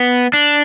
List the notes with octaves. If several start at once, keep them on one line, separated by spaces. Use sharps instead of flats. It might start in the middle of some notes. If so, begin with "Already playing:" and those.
Already playing: B3
D4